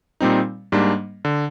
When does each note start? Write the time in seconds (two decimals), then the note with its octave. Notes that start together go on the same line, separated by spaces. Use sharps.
0.20 A#2 G3 C4 D#4
0.72 G#2 G3 A#3 D4
1.25 D3